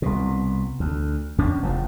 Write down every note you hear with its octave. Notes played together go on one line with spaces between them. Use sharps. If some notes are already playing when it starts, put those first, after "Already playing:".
C2 B2
D2
E2 F3 C#4 D4
F1 E2 A#2 F3